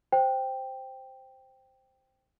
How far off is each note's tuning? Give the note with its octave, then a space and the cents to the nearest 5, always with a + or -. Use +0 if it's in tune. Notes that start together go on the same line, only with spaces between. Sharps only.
C5 +0 G5 +0